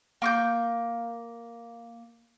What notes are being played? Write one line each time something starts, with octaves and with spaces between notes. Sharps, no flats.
A#3 C#6 G6